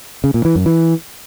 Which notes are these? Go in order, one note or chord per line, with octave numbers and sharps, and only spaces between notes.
C#3
A#2
E3
F#2
E3